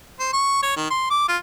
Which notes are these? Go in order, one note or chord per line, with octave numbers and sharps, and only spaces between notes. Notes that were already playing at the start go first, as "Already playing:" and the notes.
C5
C#6
C#5
D#3
C6
D6
F4